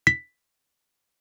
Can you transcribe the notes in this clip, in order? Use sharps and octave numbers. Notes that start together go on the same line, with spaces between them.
B6